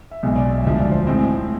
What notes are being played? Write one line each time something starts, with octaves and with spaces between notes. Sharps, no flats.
E5
B1 B2 G#3 E5
D5
E5
E1 D2 D3 F3 G#3 E5
D5
C5
A2 G#3 C4 E4